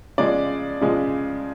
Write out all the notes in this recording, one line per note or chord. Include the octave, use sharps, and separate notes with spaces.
C#3 F3 G#3 D5
C#3 F3 G#3